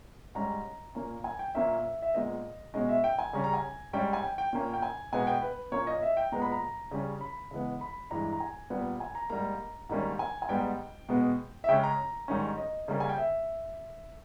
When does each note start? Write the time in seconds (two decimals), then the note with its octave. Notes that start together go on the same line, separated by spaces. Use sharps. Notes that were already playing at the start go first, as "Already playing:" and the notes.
0.35 G#2 G3 C#4 A#5
0.95 A#2 A#3 C#4
1.24 G#5
1.39 G5
1.55 A#2 A#3 C#4 E5
2.02 E5
2.14 A#2 G#3 B3 D#5
2.74 B2 G#3 C#4 D#5
2.89 E5
3.04 G5
3.19 G#5
3.33 C#3 G3 C#4 A#5
3.44 A#5
3.54 G#5
3.93 G#2 G3 C#4 G5
4.13 G#5
4.23 G5
4.38 G5
4.53 A#2 A#3 C#4
4.74 G5
4.82 G#5
5.13 B2 G#3 B3 G#5
5.27 G5
5.42 B4
5.72 A#2 A#3 C#4 C#5
5.87 D#5
6.02 E5
6.17 G5
6.32 A#2 G#3 B3 A#5
6.42 B5
6.52 A#5
6.91 C#3 G3 C#4
7.21 B5
7.51 C#3 E3 G#3 B3
7.81 B5
8.11 G2 E3 G#3 A#5
8.32 A#5
8.40 G#5
8.70 A#2 G3 B3
9.00 G#5
9.15 A#5
9.30 G#2 G3 A#3 A#5
9.89 G#2 D#3 G3 A#3 C#4
10.19 G#5
10.42 G#5
10.49 G#2 G3 B3 G5
11.09 B2 G#3 B3
11.64 E5
11.69 C#3 G#3 C#4 G5
11.83 A#5
12.28 G#2 D#3 G3 C#4
12.58 D#5
12.88 C#3 G3 A#3 C#4
13.00 G#5
13.09 G5
13.18 E5